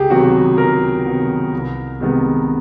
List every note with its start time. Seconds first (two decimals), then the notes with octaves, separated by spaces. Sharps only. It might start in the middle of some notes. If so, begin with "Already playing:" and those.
Already playing: C#2 G4 G#4
0.10 C3 D#3 F#3 B3 F#4
0.57 C#2 A#4
1.05 C3 D#3 F#3 B3
1.53 C2
2.00 C3 D#3 G#3 B3